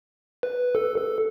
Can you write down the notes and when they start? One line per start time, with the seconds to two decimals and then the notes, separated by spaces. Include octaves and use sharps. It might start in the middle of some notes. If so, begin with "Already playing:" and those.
0.43 B4
0.75 A4
0.98 A4